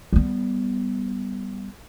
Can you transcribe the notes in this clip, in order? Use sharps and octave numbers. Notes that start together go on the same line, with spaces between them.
G3 B3